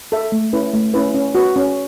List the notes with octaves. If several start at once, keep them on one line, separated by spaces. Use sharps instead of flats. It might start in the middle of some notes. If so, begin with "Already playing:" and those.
A4 E5
A3
C#4 E4 B4
A3
C#4 E4 B4
C#4
F#4 B4
C#4